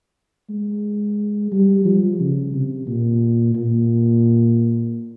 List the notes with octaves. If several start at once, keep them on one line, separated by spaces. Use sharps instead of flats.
G#3
G3
F3
C#3
C3
A#2
A#2